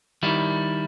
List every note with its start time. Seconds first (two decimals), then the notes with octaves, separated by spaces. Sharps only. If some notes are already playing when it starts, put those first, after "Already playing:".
0.23 D#3 G3 E4